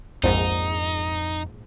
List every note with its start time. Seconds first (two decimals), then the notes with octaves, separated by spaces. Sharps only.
0.24 A#1 F2 G#2 D#4